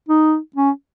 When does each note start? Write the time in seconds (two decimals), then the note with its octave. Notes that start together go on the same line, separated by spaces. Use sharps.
0.09 D#4
0.56 C#4